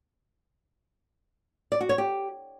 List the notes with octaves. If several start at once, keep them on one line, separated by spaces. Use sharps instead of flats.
D5
F#4
C#5
G4